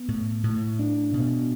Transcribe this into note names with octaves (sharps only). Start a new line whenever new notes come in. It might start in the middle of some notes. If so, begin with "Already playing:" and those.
Already playing: B3
A2
A2
D4
B2